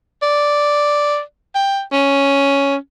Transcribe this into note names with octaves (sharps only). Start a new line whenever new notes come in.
D5
G5
C#4